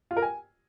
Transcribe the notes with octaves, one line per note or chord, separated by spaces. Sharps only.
F4
A#4
G#5